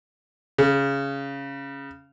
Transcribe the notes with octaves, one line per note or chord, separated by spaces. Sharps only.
C#3